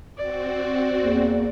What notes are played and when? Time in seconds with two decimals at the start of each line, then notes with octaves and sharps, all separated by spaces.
0.18 C4 F#4 D5
1.02 E2 A#3